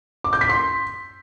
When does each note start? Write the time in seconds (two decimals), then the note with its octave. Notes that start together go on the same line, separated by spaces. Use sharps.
0.24 D6
0.33 G6
0.41 B6
0.49 C6